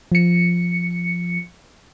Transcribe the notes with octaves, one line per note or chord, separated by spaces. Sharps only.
F3 C#7